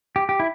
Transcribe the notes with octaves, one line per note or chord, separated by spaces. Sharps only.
G4
G4
E4